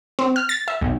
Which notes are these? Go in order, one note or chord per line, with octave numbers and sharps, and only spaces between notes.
C4
F6
A6
E5
B1